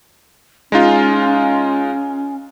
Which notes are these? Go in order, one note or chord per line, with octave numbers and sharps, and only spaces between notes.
G#3 C#4 D#4 F4